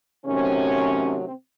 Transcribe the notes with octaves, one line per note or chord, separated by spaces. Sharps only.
C3 D#3 F#3 A3 C4 C#4
C4